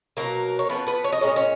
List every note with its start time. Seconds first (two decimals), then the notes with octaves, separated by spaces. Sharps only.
0.17 B2 F#3 A#3 A#4
0.59 C#5
0.69 F3 A#3 B3 C#4 B4
0.87 B3 B4
1.04 C#5
1.13 D#5
1.21 A#2 G#3 C#4 C#5
1.29 D#5
1.36 C#4 C#5